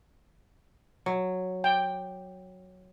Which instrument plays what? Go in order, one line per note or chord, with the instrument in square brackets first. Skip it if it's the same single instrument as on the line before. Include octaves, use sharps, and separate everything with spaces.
[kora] F#3
[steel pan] G5